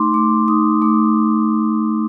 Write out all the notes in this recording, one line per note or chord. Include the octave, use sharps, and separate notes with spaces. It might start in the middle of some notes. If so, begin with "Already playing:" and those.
Already playing: A3 D#4 C6 D6
A3 D6
D#4 D#6
A3 D6